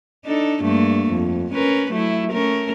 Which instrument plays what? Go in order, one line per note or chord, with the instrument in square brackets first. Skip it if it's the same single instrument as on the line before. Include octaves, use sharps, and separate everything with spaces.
[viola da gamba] D4 D#4 A4
G2 A3 A#3
F2
C#4 A#4 B4
F#3 A3 E4
A3 C#4 A#4